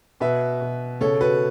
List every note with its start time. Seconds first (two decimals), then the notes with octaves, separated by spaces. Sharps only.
0.20 B2 B4 E5
0.61 B2
1.01 C#3 A4 C#5
1.21 F#4 B4